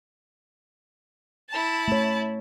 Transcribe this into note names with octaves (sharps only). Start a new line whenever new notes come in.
E4 A5
A3 C#5